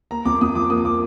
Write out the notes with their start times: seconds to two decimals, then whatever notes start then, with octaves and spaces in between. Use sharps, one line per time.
0.11 A#3 A#5
0.25 F2 D6
0.41 F2 D#6
0.55 F3 D6
0.70 A#3 D#6
0.85 D6